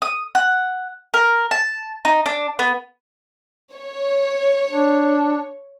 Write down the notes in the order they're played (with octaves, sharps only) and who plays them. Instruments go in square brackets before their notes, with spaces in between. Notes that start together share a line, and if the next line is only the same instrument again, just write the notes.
[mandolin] D#6
F#5
A#4
A5
D#4
D4
B3
[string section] C#5
[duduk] D4